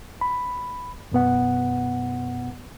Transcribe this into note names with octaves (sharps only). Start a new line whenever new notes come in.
B5
F#2 B2 B3 F#5